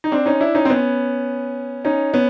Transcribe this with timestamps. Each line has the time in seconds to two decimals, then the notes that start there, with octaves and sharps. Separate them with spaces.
0.04 D#4
0.12 C4 D4
0.26 C#4 D#4
0.40 D4 E4
0.55 C#4 D#4
0.65 C4
0.70 B3 C#4
1.85 C#4 D#4
2.13 B3 C#4